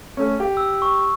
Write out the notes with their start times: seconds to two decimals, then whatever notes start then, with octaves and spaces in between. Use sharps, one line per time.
0.17 A3 C#4
0.40 G4
0.57 E6
0.82 C#6